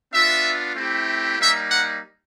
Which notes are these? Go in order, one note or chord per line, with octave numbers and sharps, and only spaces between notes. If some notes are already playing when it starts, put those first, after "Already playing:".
B3 D4 F4 E5
A3 C4 E4 G4
G3 A#3 D#4 E5
F#5